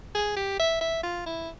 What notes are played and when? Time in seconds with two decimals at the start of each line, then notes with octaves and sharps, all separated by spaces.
0.15 G#4
0.37 G4
0.59 E5
0.81 E5
1.03 F4
1.26 E4